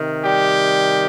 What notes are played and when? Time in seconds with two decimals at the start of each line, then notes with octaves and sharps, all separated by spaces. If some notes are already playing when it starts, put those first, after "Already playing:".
Already playing: C3 D#3
0.25 G3 G4